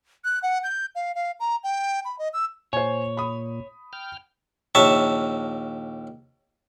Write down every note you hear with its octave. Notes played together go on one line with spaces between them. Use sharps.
F#6
F#5
G6
F5
F5
A#5
G5
B5
D#5
E6
A#2 C5 C#5 G#5
B5 D#6
G5 F6
A#1 D#2 C#5 E5 A5